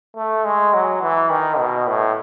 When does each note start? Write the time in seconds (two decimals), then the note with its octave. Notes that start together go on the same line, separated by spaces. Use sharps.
0.16 A3
0.45 G#3
0.74 F#3
1.02 E3
1.30 D#3
1.59 B2
1.88 A2